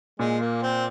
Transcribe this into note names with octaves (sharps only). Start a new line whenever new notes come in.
A#2 G#3
A#3
C4